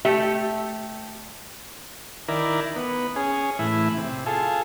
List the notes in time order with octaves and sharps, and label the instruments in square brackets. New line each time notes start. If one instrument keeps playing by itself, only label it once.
[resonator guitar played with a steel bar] A3 G4 E5
[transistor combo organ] D#3 E4 A#4 D5
B3
C#4 G#4
A2 E3 E4
C3
F4 G#4 A4